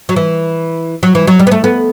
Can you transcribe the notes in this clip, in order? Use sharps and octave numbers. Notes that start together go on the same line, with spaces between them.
F#3
E3
F#3
E3
F#3
G3
B3
A3
B3